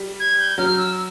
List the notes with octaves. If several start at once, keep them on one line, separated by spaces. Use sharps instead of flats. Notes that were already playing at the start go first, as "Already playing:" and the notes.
Already playing: G3
G#6
G6
F#3 F6
E6